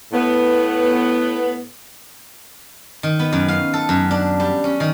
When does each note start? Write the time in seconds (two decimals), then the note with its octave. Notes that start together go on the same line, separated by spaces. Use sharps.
0.13 A2 B3
3.03 D#3
3.19 B3
3.33 F#2
3.48 F5
3.74 A4
3.89 F#2
4.11 D4
4.40 G3
4.64 C#4
4.80 D#3